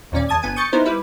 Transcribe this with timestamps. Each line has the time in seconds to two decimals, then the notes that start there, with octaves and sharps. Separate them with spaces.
0.12 D#2 A#2 C#4 D5
0.29 E2 A5 D#6 G#6
0.42 G1 B3 G#5 D#7
0.56 C#6 D#6 G6 A6 C#7
0.73 B3 D#4 E4 A#4 C5
0.85 G3 E4 B4